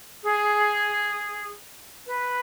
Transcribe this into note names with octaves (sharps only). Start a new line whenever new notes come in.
G#4
B4